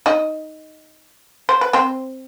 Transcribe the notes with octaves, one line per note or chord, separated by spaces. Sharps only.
D#4 D#5
C5
B4
C4 C5